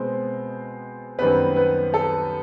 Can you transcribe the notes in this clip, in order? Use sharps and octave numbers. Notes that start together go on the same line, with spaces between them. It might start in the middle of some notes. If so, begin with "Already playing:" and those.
Already playing: B2 G#3 B3 C4 C5
F#2 D#3 G3 B3 C4 B4
B3 B4
A4